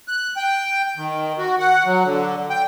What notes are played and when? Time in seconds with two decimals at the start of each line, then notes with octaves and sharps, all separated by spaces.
0.08 F#6
0.37 G5
0.97 D#3
1.38 F#4
1.59 F#5
1.86 F#3
2.04 D3
2.50 G5